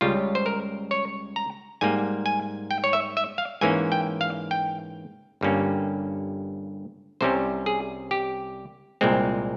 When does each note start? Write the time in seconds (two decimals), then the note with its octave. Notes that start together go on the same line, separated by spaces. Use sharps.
0.01 C#2 C#3 G3 F4
0.35 C5
0.46 A#4
0.91 C#5
1.36 A#5
1.81 G#2 G3 A#3 G#5
2.26 G#5
2.71 G5
2.84 C#5
2.93 E5
3.17 E5
3.38 F5
3.61 G#2 E3 A#3 C#4 G#5
3.92 G5
4.21 F5
4.51 G5
5.41 G1 G2 G3 A#3 C#4
7.21 C2 C3 G3 C#4 C5
7.66 G#4
8.11 G4
9.01 C2 A#2 G#3 C4